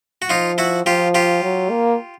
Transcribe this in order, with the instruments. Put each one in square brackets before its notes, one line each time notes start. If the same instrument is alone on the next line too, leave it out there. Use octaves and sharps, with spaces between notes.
[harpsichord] F#4
[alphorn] F3 [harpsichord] D#4 F4
[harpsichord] E4 F#4
[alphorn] F3 [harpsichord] F4 G4
[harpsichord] F4 G4
[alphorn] F#3
A#3